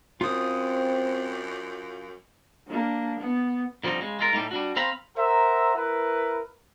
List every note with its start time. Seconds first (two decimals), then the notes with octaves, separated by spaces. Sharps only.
0.21 F#2 C4 F4 D#6
2.68 A#3 D4
3.19 B3
3.84 D3 F3 G3 C4 D#4
4.01 C#3 G#3
4.19 G#3 F4 A#4
4.33 A2 G3 A3 A#3 D#4
4.51 G3 D4 F#4
4.76 C4 C5 F5 A#5 B5
5.16 A#4 C5 E5 F#5 A#5
5.74 E4 A#4 B4